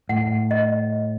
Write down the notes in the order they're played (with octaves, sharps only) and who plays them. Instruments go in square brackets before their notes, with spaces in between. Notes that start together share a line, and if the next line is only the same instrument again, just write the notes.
[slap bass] A2 [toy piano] F#5
[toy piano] D#5